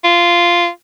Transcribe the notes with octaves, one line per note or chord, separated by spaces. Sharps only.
F4